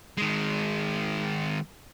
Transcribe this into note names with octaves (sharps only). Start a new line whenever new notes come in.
D#3 G#3